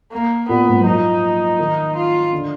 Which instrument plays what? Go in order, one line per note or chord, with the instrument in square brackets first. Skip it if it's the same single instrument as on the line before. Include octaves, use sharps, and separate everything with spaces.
[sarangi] A#3
[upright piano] A#2 [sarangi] B3
[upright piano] G#2
F#3
[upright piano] F3 [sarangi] D#4
[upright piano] D#3
[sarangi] F4
[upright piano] D3